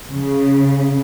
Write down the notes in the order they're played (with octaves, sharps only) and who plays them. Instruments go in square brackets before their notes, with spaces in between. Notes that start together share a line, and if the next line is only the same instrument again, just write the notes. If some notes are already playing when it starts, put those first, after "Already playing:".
[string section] C#3